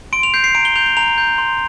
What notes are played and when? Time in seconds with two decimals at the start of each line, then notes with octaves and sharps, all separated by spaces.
0.13 C6 D7
0.23 F7
0.34 G6 C7
0.44 C7
0.55 A#5 D7
0.65 G7
0.75 G6 F7
0.86 F7
0.97 A#5 F7
1.18 G6
1.38 C6